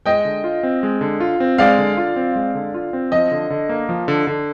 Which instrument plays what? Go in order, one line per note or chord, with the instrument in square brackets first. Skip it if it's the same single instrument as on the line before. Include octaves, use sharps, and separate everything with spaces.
[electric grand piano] G#3 [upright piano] D#5 G5
[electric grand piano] D3
F4
C4
G#3
D3
F4
C4
[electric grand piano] G#3 [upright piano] D5 F5
[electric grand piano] D3
F4
C4
G#3
D3
F4
C4
[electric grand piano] F3 [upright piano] D#5
[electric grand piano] D3
D3
A#3
F3
D3
D3